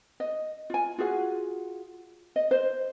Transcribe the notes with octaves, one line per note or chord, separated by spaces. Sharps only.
D#5
F4 G#5
F4 F#4 G#4 F#5
D#5
C5